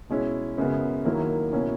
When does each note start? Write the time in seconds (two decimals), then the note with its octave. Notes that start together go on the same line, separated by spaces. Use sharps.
0.10 B2 G#3 C#4 E4
0.57 F#2 C#3 G#3 B3
1.05 D#2 D#3 F#3 A#3 E4
1.53 B2 A#3 C#4 E4